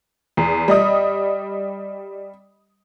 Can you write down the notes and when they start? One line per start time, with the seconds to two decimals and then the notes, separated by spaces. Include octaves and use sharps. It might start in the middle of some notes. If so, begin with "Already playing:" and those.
0.37 E2
0.68 G3 D#5 D#6